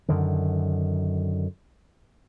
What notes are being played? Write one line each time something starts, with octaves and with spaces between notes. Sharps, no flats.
F#2 D3 D#3